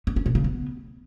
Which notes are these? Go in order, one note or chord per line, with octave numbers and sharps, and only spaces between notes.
B3
C#4
B2
C#3
B3